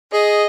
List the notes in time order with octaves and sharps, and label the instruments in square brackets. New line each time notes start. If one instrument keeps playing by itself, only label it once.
[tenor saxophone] G#4 [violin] D#5